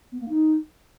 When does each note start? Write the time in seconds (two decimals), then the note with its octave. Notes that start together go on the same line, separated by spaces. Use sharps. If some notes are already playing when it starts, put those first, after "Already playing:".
0.12 B3
0.21 A#3
0.29 D#4